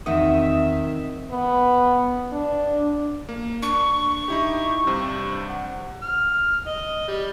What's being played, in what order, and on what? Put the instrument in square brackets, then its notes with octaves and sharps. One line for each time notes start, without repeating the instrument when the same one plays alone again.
[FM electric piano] E2 D#6 [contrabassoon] D#3 [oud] C4 D#4 F#4 [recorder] E5
[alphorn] B3
D4
[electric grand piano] A#3
[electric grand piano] D4 [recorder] C#6
[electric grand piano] D#4 E4 G4
G2 C3 C5
F#5
[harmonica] F6
D#5
G3